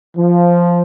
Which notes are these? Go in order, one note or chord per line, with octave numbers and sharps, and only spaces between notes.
F3